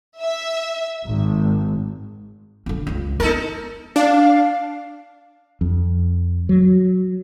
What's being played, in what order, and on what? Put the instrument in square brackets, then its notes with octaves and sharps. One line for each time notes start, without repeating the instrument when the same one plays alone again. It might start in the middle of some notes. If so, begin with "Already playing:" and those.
[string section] E5
G#1
[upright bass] D3 C#4
C#2 G#3
[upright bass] B3 D4 [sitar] D#4 A4 A#4
[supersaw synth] D4 [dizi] F5
[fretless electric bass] F2
F#3